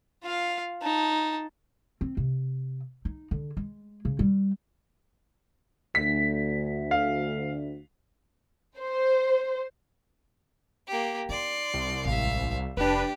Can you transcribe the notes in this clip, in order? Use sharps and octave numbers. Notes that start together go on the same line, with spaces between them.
F4 F5
D#4 A5
C4
C3
D#4
D3
G#3
C#3
G3
D2 B6
F5
C5
A#3 G4
D#4 D5 C6
C2
A1 G#3 E5 F5
F1 D4 G4 B4